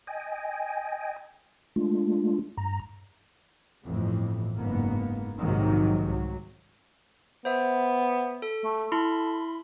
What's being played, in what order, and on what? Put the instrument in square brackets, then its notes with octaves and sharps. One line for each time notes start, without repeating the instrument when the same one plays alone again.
[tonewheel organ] D#5 G5 G#5
G#3 A3 D4 F4
G2 A#5
[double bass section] G1 F2 A2 E3
F#1 G#2 A#3 B3
A#1 G#2 C3 D#3 F#3
C2 F#3
[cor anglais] B3 [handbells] C5 E5
[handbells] A4
[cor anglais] A3
[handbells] E4 B5 C6 [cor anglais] A4